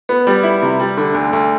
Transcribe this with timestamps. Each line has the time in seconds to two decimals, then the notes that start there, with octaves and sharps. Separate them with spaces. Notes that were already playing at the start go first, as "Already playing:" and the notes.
0.09 B3
0.27 G3
0.43 E4
0.62 C3
0.80 G3
0.97 D3
1.14 D2
1.33 D2